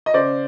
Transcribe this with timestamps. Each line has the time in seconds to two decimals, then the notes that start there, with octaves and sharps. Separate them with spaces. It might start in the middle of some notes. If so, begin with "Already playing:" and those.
0.06 D#5
0.14 C#3 C5 D5